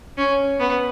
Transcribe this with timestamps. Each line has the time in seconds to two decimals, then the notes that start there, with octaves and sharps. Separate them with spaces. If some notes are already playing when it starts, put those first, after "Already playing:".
0.18 C#4
0.59 B3